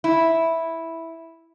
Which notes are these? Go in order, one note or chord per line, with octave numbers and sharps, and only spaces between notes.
E4